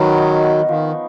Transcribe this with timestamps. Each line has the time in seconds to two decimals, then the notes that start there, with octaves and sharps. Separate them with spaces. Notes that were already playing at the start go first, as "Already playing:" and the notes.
Already playing: D#3 F#3 B3 C#4 B4
0.17 D#4
0.43 B3
0.68 D#3 F3